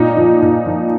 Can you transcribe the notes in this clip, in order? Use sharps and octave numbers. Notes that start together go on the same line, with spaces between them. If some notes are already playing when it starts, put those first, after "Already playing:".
Already playing: A#2 D#4
F3
A#2
F3